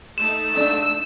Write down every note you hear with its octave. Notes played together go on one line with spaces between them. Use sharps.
A3 D#4 E7
D4 E6